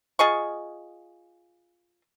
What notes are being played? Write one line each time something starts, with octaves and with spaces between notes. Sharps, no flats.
F4 G#4 D#5 C#6